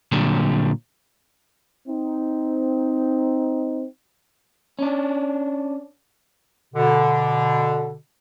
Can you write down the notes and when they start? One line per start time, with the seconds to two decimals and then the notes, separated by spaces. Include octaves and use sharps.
0.12 A#2 D3 F#3 G3
1.88 C4 D#4
4.79 C#4 D4
6.75 B2 D3